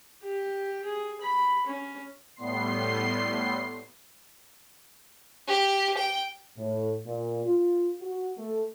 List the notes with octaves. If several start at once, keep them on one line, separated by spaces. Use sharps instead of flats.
G4
G#4
B5
C#4
A2 G3 B3 C6 C7
G4
G5
A2
A#2
F4
F#4
A3